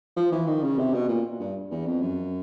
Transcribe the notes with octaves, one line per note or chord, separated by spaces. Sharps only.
F3
E3
D#3
C#3
C3
B2
A#2
G2
E2
F2
F#2